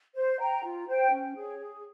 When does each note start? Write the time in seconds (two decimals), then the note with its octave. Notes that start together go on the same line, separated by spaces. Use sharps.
0.15 C5
0.39 G5 A#5
0.63 F4
0.87 C5 G5
1.11 C#4
1.35 G#4 C#5
1.59 G#4